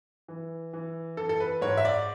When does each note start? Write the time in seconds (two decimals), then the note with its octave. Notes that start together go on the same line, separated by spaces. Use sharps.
0.28 E3
0.73 E3
1.17 E3 A4
1.29 A4
1.40 B4
1.61 G#2 C#5
1.77 E5
1.85 D5